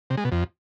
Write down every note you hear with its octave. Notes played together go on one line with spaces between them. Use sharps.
C3
G#3
B2
F2